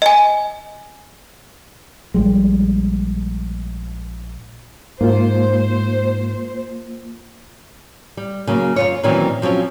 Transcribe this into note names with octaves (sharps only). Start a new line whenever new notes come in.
D#5 G#5
A#1 G3 G#3
G#2 A#3 F4 C5
G3
C#3 F#3 A#3
F#2 F4 C#5
A#2 D#3 E3 F#3 C4 C#4
F3 F#3 C4 C#4